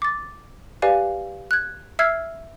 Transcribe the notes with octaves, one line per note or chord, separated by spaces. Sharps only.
D6 A6
G4 B4 D5 F5 G#5
F#6 G#6
E5 E6 F6 G#6 C7